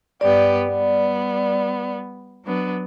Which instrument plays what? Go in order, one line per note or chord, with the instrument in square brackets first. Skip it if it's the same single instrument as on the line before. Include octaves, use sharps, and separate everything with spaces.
[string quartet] G2 B3 G4 [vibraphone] D5
[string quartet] G3 B3
F#3 B3 D4